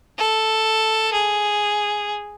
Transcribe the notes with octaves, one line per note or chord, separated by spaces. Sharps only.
A4
G#4